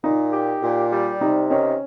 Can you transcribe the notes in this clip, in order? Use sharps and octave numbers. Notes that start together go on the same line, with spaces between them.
A#2 D#4
G4
A#2
G3
C3 D#4
D#3 C#4